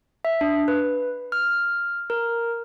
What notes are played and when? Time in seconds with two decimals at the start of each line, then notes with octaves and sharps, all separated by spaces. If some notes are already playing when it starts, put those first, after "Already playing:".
0.25 E5
0.41 D4
0.68 B4
1.32 F6
2.10 A#4